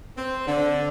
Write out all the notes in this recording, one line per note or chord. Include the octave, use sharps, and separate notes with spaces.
C4
D3